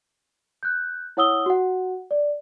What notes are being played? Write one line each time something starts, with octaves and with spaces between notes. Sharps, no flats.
F#6 G6
E4 C#5 F#5 D#6 E6 G7
F#4 F#5
D5